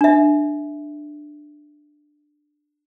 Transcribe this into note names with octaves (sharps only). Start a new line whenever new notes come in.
D4 E5